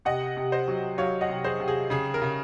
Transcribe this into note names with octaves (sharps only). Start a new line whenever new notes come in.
C3 D#5 F#5
C3
C5 D#5
F#3
F#3 C#5 F5
D#5 F#5
C3
G#4 C5
C3
G#4
C#3 G#4
A#4
C#3